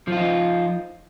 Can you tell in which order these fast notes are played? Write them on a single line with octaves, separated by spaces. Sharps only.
F3 F4 D#4